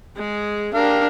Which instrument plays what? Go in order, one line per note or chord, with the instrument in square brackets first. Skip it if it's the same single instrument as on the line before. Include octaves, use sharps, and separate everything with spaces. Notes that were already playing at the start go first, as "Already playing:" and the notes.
[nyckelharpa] G#3 G#4
[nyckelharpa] D4 [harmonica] G4 A#4 F5